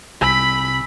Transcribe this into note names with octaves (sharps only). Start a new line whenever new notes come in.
C2 G#5 B5 E6 B6